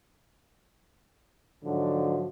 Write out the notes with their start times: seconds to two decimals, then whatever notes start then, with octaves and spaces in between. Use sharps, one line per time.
1.63 G#2 D3 F3 F#3